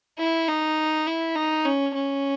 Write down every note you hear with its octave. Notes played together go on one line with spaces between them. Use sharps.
E4
D#4
E4
D#4
C#4
C#4